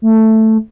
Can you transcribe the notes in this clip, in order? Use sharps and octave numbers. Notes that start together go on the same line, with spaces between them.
A3